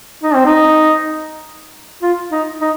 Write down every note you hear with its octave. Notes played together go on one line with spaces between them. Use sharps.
D#4
C4
D#4
F4
D#4
D#4